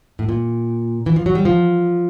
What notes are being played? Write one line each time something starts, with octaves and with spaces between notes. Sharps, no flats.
A2
A#2
E3
F3
F#3
G3
F3